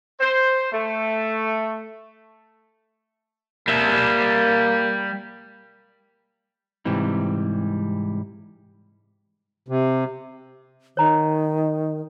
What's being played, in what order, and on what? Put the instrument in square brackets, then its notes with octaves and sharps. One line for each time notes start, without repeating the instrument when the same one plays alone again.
[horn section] C5
A3
[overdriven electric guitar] G3 E5 [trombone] A#3
[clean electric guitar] G#2 C3 E3 G3
[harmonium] C3
[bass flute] D#3 [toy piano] C#5 A#5